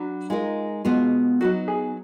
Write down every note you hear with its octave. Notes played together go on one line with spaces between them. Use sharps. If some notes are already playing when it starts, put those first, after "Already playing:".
Already playing: F#3 D4 F#4 B4
G#3 D#4 F4 A#4
B2 G#3 B3 F4
F#3 B3 D#4 F#4
G#4